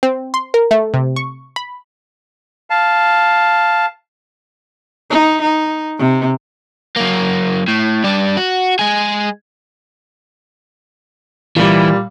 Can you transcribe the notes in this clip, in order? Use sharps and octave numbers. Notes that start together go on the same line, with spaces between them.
C4
C6
A#4
A3
C3
C#6
B5
F5 A5
D#4
D#4
C3
F#2 A#3
A2
G2 D4
F#4
G#3 G#4
A#2 E3 G3